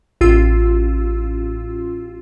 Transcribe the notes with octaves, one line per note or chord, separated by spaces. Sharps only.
A1 F4 E6